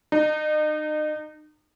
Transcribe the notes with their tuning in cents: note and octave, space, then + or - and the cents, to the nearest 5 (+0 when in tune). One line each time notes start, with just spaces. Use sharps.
D#4 -35